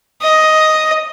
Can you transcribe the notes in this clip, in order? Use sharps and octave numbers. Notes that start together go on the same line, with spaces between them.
D#5